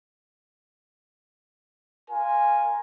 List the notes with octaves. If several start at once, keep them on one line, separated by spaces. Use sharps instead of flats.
F4 A#4 G#5